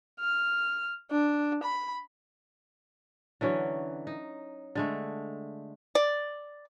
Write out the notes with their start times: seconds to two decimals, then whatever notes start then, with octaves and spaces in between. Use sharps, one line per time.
0.20 F6
1.11 D4
1.63 B5
3.41 D3 E3 F#3 C#4
4.07 D#4
4.75 D3 G#3 A3
5.95 D5